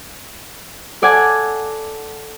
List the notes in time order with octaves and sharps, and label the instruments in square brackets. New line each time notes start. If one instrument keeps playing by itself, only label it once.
[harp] A4 D5 F#5 G#5 A5